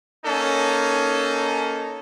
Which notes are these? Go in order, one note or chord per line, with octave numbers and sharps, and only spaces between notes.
A#3 C#4 D#4 A4